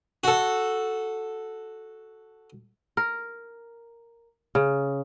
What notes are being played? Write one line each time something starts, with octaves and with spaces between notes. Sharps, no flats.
F#4 A4
A#4
C#3